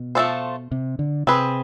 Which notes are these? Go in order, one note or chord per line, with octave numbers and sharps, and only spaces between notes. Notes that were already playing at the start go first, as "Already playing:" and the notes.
Already playing: B2
F3 A3 D4 A4 C5
C3
D3
C3 C4 G#4 B4